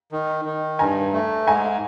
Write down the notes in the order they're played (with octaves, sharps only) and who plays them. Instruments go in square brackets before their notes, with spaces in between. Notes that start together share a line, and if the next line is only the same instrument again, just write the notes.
[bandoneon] D#3
D#3
[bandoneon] G2 [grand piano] G#5 A#5
[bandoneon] A3
[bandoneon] G#2 [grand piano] G#5 A#5